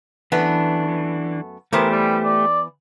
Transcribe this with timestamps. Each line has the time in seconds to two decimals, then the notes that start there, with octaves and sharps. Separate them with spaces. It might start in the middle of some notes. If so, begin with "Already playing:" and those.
0.32 F#2 E3 A3 B3 D4
1.73 E3 A3 B3 G4 A#4 C5
1.91 G3
2.24 D5